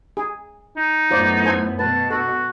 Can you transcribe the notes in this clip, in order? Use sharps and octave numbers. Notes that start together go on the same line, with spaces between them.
G#4
D#4
F#2 A2 B3 F4 C5 D5
A4 C5 G#5
B2 B4 A5
F#4 A4